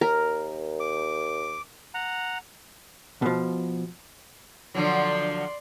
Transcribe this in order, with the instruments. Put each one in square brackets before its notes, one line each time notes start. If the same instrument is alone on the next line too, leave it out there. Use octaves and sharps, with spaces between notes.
[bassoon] D#2 [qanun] A#4
[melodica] D6
F#5 A#5
[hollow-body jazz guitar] B2 F3
[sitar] D3 F3 F#3 [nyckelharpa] D5 C6